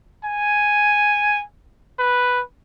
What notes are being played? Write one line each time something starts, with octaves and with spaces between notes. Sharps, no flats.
G#5
B4